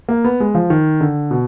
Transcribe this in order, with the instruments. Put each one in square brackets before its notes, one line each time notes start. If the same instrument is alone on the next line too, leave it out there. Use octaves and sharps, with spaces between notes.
[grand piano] A#3
B3
G#3
F3
D#3
D3
B2